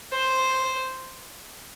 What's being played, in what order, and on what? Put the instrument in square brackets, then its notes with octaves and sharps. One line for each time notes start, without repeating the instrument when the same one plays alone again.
[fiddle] C5